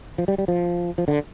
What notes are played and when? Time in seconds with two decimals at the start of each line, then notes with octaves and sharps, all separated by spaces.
0.18 F3
0.28 G3
0.38 G3
0.48 F3
0.98 F3
1.08 D3